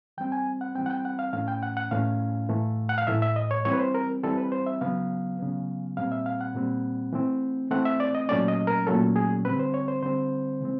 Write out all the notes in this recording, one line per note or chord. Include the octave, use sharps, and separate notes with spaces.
E3 G3 C4 G5
G#5
F#5
E3 G3 C4 G5
F#5
G5
F#5
F5
A2 E3 A3 C#4 F5
G5
F#5
F#5
A2 E3 A3 C#4 F5
A2 E3 A3
F#5
F5
A2 E3 A3 E5
E5
D#5
C#5
E3 G3 C4 C#5
B4
C5
A#4
E3 G3 C4 A4
B4
C5
E5
C#3 F#3 B3 F5
C#3 F#3 B3
A#2 G3 C4 F5
E5
F5
F#5
A#2 G3 C4
E3 A3 C4
E3 A3 C4 F#5
E5
D5
D#5
A#2 F#3 A3 C#4 D5
D#5
A#4
A#2 F#3 A3 C#4 A4
G#4
D3 G3 C4 B4
C5
C#5
C5
D3 G3 C4 C5
C#3 E3 G#3 C4